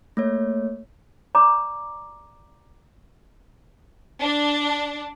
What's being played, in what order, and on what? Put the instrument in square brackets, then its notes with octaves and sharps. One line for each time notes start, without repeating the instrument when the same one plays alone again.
[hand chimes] A3 A#3 C#5
[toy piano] D5 A#5 D6
[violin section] D4